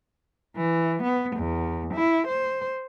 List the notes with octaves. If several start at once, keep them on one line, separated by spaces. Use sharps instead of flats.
E3
B3
E2
E4
C5